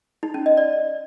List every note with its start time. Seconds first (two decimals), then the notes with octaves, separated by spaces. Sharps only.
0.23 D#4
0.34 C#4
0.46 D#5
0.57 D5